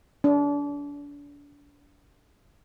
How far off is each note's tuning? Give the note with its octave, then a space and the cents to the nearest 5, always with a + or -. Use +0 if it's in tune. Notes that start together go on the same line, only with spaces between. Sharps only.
D4 -35